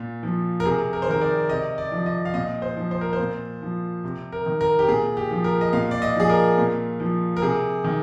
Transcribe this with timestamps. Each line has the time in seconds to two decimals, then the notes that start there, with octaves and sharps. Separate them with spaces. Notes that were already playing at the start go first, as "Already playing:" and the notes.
Already playing: A#2
0.23 F3
0.60 A#4
0.65 C3 G#4
0.93 A#4
1.02 C5
1.07 D#3 A#4
1.21 D5
1.49 C3 D#5
1.78 D5
1.92 F3
2.06 D#5
2.25 F5
2.34 A#2 D#5
2.62 C5
2.77 F3
2.91 C5
3.01 A#4
3.13 C5
3.19 A#2
3.62 F3
4.04 C3
4.32 A#4
4.46 D#3
4.61 A#4
4.79 G4
4.88 A#2 G#4
5.17 G4
5.31 F3
5.44 A#4
5.61 D#5
5.73 A#2 F5
5.91 D5
6.02 D#5
6.16 F3 G#4
6.29 A#4
6.58 A#2
7.00 F3
7.37 A#4
7.42 C3 G#4
7.84 D#3